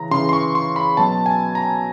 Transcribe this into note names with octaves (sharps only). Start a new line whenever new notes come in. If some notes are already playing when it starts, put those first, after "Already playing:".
Already playing: C#3 E3 A#5
C#3 E3 C6
C6
C#6
C6
B5
B2 F#3 A5
G#5
A#5